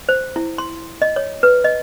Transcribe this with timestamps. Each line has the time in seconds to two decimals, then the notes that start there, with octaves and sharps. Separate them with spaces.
0.09 C5
0.36 E4
0.58 C6
1.02 D#5
1.16 C#5
1.43 B4
1.64 D#5